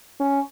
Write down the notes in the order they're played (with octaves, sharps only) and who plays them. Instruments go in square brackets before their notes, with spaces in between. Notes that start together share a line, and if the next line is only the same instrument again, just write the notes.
[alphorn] C#4